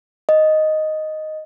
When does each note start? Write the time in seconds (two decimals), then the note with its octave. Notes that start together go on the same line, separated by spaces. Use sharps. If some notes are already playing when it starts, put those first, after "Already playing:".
0.29 D#5